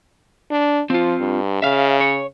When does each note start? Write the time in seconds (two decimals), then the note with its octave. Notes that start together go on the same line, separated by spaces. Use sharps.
0.51 D4
0.90 F3 C4 F4
1.20 G2
1.62 C#3 E5 F5
2.01 C#5